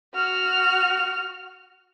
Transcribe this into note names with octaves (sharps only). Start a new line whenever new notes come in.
F#4 F6